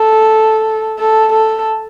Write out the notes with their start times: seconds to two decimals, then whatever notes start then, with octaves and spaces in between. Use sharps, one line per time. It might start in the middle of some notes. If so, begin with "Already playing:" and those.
Already playing: A4
0.99 A4
1.33 A4